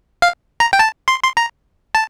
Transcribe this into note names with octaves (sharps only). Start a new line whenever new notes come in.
F5
A#5
G5
A5
C6
C6
A#5
A5